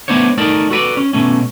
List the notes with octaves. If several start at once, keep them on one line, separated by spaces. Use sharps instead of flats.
A3 B3 D4 C5 C#5
A3 D#4 A#4 D5
F#4 A4 B4 D5
C#4
B2 A3 C#4